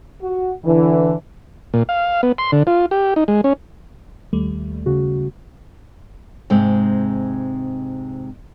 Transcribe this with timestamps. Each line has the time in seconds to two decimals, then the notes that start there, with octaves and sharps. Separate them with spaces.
0.21 F#4
0.64 D3 E3
1.74 A#2
1.89 F5
2.23 B3
2.38 C6
2.52 D3
2.67 F4
2.91 G4
3.16 D#4
3.28 G#3
3.44 C#4
4.33 D#2 G3 A3
4.86 C#3 F#4
6.50 G#2 C3 G#3 C4